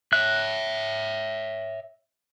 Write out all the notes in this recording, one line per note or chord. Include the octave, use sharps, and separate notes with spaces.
C#5 E5 F#6